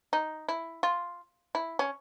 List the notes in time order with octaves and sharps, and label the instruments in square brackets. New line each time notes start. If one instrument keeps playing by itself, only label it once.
[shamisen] D#4
E4
F4
E4
C#4